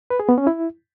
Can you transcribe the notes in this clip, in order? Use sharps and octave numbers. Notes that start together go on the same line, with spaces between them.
B4
G#4
B3
C#4
E4